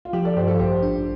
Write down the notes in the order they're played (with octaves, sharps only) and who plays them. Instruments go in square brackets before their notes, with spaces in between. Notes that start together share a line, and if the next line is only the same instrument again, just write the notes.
[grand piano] F4
[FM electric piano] F3 [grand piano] G4
[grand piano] A4 D5
[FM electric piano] G2 [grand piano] G4 C5
[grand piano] F4 A4
[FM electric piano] A1 [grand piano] G4 C5
[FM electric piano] D4